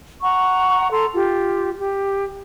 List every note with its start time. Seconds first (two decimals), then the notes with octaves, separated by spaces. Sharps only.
0.22 F#5 A#5 C#6
0.91 A4 A#5 C6
1.14 F4 G4
1.78 G4